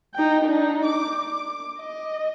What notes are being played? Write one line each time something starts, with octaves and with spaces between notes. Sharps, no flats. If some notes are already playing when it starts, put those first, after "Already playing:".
D#4 G5
D4 D#4
D6
D6
D#5